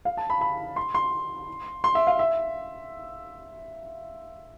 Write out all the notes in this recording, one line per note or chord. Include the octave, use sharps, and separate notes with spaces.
F5
A5
B5
B5
C6
C6
C6
E5
F5
E5